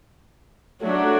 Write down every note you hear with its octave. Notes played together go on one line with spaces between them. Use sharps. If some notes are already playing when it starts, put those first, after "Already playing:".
F#3 A3 D4 F#4